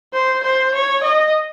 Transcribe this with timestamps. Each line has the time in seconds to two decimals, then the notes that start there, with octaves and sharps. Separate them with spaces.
0.14 C5
0.44 C5
0.74 C#5
1.04 D#5